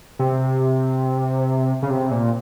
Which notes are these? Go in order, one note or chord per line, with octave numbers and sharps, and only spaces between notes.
C3
C#3
C3
A#2